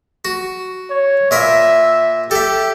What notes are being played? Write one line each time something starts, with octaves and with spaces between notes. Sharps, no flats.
F#4
C#5
A#2 A#4 E5 B5
G4 A4 E5